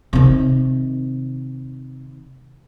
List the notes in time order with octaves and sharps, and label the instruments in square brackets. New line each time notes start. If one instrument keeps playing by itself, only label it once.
[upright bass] C3 D#3